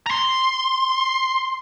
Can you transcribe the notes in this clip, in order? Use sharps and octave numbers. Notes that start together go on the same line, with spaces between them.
A#5 C6